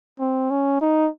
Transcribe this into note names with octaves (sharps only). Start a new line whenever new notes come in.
C4
C#4
D#4